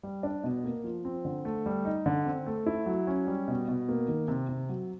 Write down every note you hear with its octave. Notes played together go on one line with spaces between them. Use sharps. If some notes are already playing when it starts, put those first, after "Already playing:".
G3
D4
B2
A#3
F3
C4
D3
A3
G3
D#4
D3
C4
A3
E4
F#3
C#4
G3
B2
B2
A#3
D#3
C3
C3
F#3